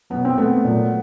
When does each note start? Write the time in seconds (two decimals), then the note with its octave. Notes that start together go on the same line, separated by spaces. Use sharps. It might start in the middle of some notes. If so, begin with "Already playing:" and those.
0.10 B2 F#3 B3
0.25 C4
0.37 A3 B3
0.65 A#2 F#3